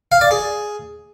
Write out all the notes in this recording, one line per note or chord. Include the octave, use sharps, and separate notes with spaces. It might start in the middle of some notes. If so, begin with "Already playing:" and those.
F5
D5
G#4